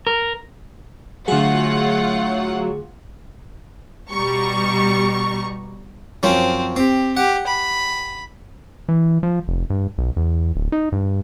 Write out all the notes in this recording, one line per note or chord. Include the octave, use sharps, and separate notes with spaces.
A#4
D3 F#3 A3 F4 G#4 F#5
B2 G3 A#5 C#6
F#2 F3 C4 C#4
C4 G4
G4 F#5
B5
E3
F3
F1
G2
B1
E2
D1
D#4
G2